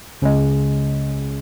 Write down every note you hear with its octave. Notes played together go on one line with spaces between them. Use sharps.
C#2 C#3 G#3